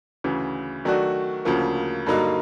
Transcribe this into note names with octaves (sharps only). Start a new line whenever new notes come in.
D2 C#3 E3
D#3 F#3 A3 D4 F#4
D2 C#3 F3 A#3
G2 D3 F#3 A#3 D#4